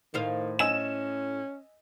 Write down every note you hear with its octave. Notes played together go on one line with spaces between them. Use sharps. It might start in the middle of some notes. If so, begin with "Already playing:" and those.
A2 D#3 C5 F5
C#4 D#5 G#5 E6 E7